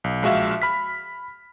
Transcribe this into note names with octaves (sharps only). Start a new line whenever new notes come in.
B1
A#1 G#3 F#4 E5 F5
B5 F6 B6